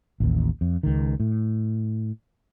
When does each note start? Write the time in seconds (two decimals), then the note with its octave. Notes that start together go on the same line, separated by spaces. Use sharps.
0.20 A1 D#2
0.61 F2
0.83 C#2 D#3
1.20 A2